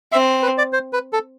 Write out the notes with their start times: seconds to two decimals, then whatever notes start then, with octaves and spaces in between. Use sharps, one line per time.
0.12 C4 E5
0.43 B4
0.58 D5
0.73 C5
0.93 B4
1.13 A4